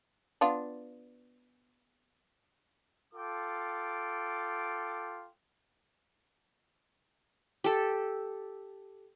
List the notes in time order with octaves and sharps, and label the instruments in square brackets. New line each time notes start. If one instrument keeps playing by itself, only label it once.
[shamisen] B3 D4 F4
[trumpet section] F4 A4 G5 D6
[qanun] G4 A4